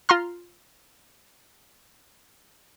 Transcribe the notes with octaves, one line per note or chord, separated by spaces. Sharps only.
F4 A#5 C6 F6